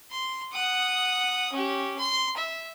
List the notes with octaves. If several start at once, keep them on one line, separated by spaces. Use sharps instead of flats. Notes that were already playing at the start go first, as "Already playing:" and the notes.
C6
F#5 D#6
C#4 G4
C6
E5